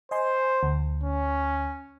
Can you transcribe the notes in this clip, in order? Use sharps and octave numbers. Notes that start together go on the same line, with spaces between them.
C5 D#5 G#5 C6
D2
C#4